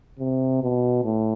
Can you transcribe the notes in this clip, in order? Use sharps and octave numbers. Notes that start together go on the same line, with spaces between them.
C3
B2
A2